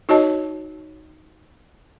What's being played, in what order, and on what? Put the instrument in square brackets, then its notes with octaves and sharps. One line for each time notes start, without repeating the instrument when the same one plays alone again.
[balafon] D#4 F#4 C#5 D#5 A5